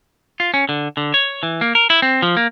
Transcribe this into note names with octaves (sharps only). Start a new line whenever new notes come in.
F4
C#4
D3
D3
C#5
E3
A#3
A#4
E4
C4
F3
A#3